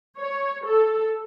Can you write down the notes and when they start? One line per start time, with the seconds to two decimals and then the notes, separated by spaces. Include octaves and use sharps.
0.17 C#5
0.65 A4